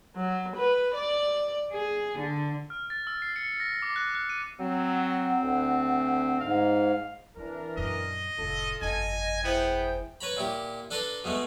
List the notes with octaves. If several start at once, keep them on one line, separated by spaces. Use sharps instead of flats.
F#3
B4
D5
G#4
D3
F6
A6
E6
C7
C#7
A#6
D6
F#6
F#6
D#7
F#3 C4 F#5
D2
G#2 F5
E3 C4 D4 A#4
F#2 A#2 D#5
F1 A2 F4 A4
G1 F2 D#5 G#5
B3 E4 G#4 C5 G5
B4 C#5 A#5 B5
A#2 E4 G4
D4 A4 B4 A5 A#5 C6
B2 G#3 A3 B3